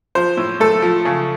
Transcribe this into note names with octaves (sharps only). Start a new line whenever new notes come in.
F3 C5
A2
A3 A4
F3
C#3